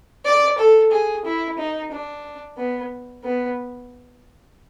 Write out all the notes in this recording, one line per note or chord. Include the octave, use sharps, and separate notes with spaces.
D5
A4
G#4
E4
D#4
D4
B3
B3